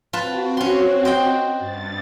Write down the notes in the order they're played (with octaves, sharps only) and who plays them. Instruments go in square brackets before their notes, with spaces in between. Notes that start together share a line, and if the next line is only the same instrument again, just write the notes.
[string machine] C4 F#4 [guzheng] F4 B4 A5
[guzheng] C#4 C6
C5 D#5 G5
[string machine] G2 A6